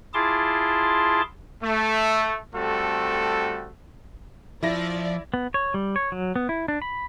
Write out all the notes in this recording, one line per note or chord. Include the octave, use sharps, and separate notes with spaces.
E4 F4 G#4 A5 C6 D6
A3
G3 A3 C4 F#4 A4
F3 E4 D5 E5 A#6
B3
C#5
G3
C#5
F#3
B3
E4
D4
B5